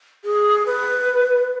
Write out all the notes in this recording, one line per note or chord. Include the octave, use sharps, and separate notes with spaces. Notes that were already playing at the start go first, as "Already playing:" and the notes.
G#4
B4